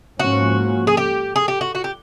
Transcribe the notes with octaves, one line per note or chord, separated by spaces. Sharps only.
G#2 F3 A#3 C#4 F#4
G#4
G4
G#4
G4
F#4
F#4
G4